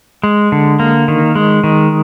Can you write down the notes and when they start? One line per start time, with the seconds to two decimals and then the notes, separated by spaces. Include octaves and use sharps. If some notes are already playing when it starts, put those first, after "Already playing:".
0.23 G#3
0.52 D3
0.80 A#3
1.08 D#3
1.35 G#3
1.64 D#3